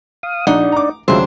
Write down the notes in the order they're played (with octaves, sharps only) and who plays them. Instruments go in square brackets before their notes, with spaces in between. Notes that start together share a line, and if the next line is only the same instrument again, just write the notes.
[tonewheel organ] F5 D#6
[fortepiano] A#1 [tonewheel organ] D4 D5 [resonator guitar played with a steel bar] D#4 F#5
[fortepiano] A#5 D6
[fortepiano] D#2 C#3 F#3 [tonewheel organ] G#3 F4 E5 [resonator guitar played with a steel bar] D4 C5